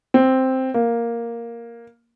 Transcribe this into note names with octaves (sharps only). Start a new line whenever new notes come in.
C4
A#3